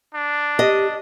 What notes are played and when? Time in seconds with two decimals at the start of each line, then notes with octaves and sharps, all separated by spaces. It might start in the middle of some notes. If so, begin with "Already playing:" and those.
0.14 D4
0.59 G4 D#5